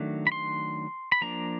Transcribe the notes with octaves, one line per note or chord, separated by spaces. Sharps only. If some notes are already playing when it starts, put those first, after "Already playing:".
Already playing: D#3 F#3 A3 D4
B5
C6
B5
F3 A#3 D4 A#5